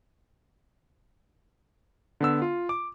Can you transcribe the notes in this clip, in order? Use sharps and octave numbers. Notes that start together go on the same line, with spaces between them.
D3 B3 E6
F4
D6